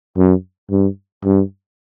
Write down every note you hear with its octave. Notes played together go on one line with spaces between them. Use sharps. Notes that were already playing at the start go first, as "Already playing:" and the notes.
F#2
G2
G2